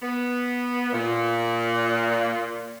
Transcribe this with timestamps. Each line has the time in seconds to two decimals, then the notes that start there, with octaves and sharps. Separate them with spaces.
0.01 B3
0.93 A#2